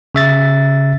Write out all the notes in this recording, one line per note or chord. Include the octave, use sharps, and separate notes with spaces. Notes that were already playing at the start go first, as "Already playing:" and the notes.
C#3 E5 A6